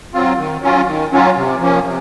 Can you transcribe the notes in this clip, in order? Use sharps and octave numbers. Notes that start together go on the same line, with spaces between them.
F#3 C4 F4
D#3
F#3 C#4 F4
D#3
F#3 C#4 F4
C3
F3 A#3 C#4
C3